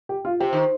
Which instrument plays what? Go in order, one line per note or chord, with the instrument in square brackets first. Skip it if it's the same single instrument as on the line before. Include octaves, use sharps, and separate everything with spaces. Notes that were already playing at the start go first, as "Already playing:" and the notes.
[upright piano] G4
F4
[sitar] C3 [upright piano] G4
[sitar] D#3